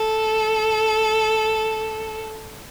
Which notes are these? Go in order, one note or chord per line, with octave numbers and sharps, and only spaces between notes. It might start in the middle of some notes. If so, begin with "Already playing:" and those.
Already playing: A4